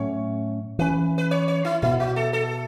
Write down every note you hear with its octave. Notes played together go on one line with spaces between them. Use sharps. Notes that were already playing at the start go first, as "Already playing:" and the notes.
Already playing: A2 F#3 A3 C#4 C#5
E3 C#4 B4
B4
C#5
C#5
E4
B2 B3 E4
F#4
A4
A4